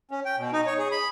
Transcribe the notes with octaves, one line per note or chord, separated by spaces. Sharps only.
C#4
G5
B2
D#4
C#5
G#4
B5